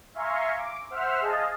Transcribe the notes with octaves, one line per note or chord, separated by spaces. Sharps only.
E5 F5 G#5 A#5 C6 C#6
D6
C5 E5 F#5 E6 F6
G#4 D#5 F5 A5